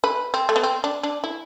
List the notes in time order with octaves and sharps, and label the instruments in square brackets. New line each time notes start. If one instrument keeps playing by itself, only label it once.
[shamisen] B4
C4
A3
B3
C4
D4
D4
E4